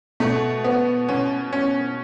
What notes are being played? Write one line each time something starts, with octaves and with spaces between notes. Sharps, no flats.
B2 A3
B3
B2 C#4
C#4